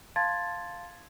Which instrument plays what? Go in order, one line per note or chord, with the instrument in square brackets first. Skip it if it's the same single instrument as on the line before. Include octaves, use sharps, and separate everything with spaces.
[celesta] F5 A5 C6 G#6 A6